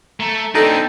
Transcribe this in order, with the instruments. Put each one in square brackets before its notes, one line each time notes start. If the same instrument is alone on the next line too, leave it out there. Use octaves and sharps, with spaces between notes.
[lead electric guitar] A3 [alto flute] A#5
[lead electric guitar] C4 D4 [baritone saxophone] D#4 [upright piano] A4 [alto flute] G5